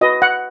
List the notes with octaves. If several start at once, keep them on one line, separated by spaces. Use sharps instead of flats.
F#4 B4 D#5
F#5